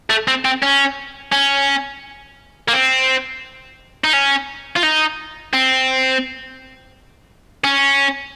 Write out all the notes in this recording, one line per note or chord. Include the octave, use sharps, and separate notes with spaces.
A3
C4
C4
C#4
C#4
A#3
C4
D#4
C#4
F4
D#4
C4
C#4